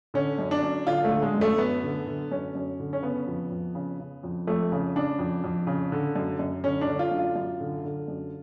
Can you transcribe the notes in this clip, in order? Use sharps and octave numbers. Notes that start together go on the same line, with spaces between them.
D3 C#4
F#2
D4
F#2
D3 F4
A3
D3
G#3
F#2
A3
F#2 B3
D3
D3
F#2 C#4
F#2
D3
C#4
C#3 B3
F2
F2
C#3
C#3
F2
F2 A3
C#3
C#3 D4
F2
F2
C#3
D3
F#2
F#2
D3 C#4
D4
D3
F4
F#2
F4
F#2
D3
D3
F#2